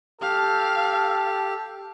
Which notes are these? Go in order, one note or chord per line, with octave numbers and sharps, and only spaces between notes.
G4 A4 F5